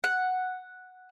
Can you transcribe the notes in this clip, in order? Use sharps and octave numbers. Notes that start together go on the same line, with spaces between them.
F#5